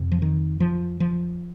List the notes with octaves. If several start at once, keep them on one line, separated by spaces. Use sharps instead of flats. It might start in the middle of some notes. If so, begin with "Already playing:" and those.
Already playing: F2 C3
F3
D#3
F3
F3